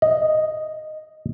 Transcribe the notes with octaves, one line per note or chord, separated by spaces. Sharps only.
D#5